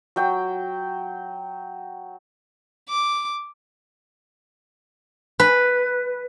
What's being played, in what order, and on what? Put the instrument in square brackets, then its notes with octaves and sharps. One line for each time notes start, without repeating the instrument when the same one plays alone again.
[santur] F#3 G5
[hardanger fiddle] D6
[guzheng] B4